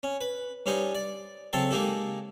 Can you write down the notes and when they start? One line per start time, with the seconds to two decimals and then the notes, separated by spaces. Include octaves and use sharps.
0.03 C#4
0.21 B4
0.66 G2 C#4 D#4 C5 D#6
0.95 D5
1.53 C#3 F#3 C4 A4 A5 C6
1.71 G#3 A#3 D#4 G4 A4